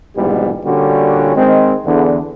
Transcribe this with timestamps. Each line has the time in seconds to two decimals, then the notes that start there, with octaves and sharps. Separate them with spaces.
0.16 A#1 G#2 B2 E3 G3
0.65 A#2 D3 G3 C#4 F#4
1.36 D#3 G#3 C4
1.86 E2 D3